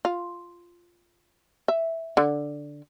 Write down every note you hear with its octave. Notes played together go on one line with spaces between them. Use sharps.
F4
E5
D3